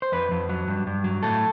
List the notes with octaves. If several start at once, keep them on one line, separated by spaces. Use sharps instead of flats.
C5
F2 B4
F2
F#3
G2
G2
F#3
A2 A4